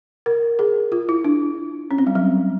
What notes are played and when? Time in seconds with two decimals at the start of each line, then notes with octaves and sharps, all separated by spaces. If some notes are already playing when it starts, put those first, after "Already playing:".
0.26 A#4
0.59 G#4
0.92 F4
1.09 E4
1.24 D4
1.91 C#4
1.98 C4
2.07 G3
2.15 F#3